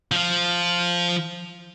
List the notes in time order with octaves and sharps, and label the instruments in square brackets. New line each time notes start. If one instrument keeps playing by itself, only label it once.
[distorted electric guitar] F3 F4